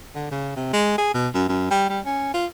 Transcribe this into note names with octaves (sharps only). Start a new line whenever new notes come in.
D3
C#3
C3
G#3
G#4
B2
F#2
F#2
G3
G3
C#4
F4